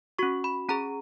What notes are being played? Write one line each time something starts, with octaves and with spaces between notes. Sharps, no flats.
C#4 F#4 C#6
B5
C#4 G#4 A#5